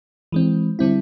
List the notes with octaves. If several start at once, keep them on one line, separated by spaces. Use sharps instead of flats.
E3 G#3 C4
D3 G3 C4 E4